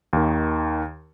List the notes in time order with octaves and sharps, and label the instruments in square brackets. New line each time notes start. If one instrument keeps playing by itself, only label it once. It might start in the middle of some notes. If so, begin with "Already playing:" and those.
[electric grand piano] D#2 D#3